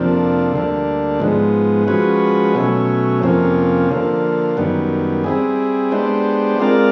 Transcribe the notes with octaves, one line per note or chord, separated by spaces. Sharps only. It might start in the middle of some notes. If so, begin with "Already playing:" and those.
Already playing: F2 C3 F3 A#3 D4
D2 D3 G3 A#3 D4
G#2 F3 G#3 B3
F3 G#3 C#4 F#4 B4
B2 F#3 A3 C#4
F2 C3 F3 A#3 C#4
D3 F3 A#3
F#2 D#3 G3 B3
G3 C4 E4 G#4
G#3 B3 D4 G4 C5
G#3 C4 F4 A#4 D5